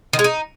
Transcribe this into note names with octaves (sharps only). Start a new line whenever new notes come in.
D#3
G#3
D#4